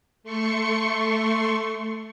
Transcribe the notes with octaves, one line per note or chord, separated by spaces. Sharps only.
A3 C6 C#6 C#7